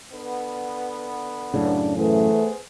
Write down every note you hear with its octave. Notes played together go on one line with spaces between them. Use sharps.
D3 B3
F#2 A2 C#3 D4
E3 A3 B3 G#4 C5